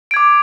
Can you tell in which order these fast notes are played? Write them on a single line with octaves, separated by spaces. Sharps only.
D7 G#6 D6